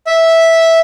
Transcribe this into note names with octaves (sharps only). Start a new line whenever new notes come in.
E5